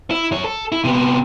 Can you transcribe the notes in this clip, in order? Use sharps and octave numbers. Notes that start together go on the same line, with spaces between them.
E4
F#2 C#5
A4
E4
C3 B3